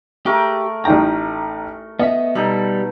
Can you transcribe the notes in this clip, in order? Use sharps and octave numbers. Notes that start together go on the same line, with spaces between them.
A3 G4 A#4
A1 D#4 G5 A#5
B3 D#5 E5
B2 G3 D#4 A4